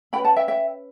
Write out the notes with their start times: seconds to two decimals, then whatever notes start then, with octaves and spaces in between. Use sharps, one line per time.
0.13 C#4 F#4 B4 G5 B5
0.24 F#5 A5
0.36 E5 G5
0.48 E5 G5